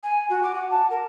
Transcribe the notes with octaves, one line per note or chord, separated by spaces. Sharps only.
G#5
F#4
D6
F#5
A5
A#4